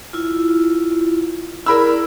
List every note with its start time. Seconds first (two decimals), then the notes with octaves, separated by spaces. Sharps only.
0.13 E4 F4
1.66 E4 G#4 A#4 D5 B5 E6